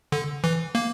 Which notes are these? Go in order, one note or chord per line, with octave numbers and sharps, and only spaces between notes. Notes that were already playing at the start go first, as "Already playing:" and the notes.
D3
E3
A#3